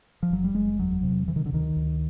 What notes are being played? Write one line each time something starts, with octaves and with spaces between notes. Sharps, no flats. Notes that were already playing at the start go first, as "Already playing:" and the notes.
F3
F#1 F#3
G3
F#1 G#3
E2 F#3
C3
C3 E3
D#3
D3
D2 D#3
D2